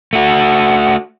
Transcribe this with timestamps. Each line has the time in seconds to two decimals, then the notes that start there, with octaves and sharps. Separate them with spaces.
0.13 A3 F#4